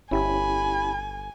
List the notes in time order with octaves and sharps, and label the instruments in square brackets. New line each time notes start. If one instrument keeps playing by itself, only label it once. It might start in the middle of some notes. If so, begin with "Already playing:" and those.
[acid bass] G1 [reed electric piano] C#4 E4 G4 [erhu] G#5 [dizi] B5